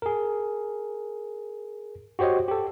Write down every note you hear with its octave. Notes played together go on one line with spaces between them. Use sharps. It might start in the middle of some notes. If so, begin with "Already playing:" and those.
G#4 A#4
F#4 G4 C5 C#5 D#5
G4 A4